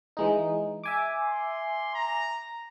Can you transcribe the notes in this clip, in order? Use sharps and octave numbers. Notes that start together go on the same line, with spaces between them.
E3 G#3 D#4
E5 G#5 D6
C6
A#5